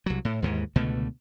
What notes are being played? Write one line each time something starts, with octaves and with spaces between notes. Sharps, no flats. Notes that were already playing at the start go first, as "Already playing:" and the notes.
C2 F#3
A2
D#2 G#2 E3
C#2 B2 D3 A3